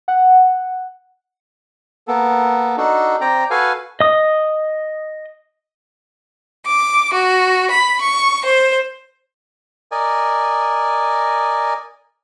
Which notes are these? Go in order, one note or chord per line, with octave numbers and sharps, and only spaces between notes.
F#5
A#3 B3 A4
D4 D#4 F#4 A4
C4 D5 G5 A#5
F#4 A4 B4 F5 G#5
D#5 D#6
D6
F#4
B5
C#6
C5
A#4 D5 D#5 G#5